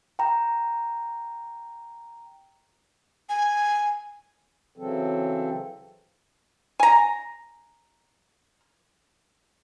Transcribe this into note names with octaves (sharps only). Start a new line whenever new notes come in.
G5 A#5
G#5
C#3 E3 F#3 C4 A4
G#5 A#5